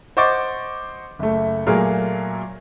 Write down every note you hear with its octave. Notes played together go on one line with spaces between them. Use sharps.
C5 D#5 F#5 C#6 D6 A6
F#1 A3
A#2 F#3 A3 A#3 G#4 A#4